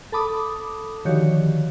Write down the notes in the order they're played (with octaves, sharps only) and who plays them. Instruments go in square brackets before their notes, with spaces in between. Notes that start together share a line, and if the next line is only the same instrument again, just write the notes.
[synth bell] A4 A5 B5 D6 D#6
D3 D#3 F3 F#4 G4 C#5